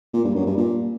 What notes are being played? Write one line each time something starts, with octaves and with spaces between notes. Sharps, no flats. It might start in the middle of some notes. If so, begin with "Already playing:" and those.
A#2
G2
F#2
G2
A#2